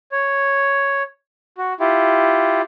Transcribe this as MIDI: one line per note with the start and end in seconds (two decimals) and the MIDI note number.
0.12 1.03 73
1.58 1.73 66
1.80 2.62 64
1.80 2.62 65
1.80 2.62 67